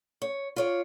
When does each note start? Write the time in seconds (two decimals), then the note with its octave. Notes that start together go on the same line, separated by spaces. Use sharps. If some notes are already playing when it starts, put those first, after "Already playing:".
0.22 C#5
0.56 F4 C#5 D5